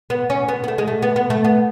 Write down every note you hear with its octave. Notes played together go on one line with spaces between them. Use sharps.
B3
C#4
B3
B3
A3
G#3
A3
B3
B3
A3
B3